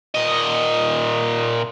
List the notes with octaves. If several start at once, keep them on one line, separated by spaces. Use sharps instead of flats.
A#2 D#5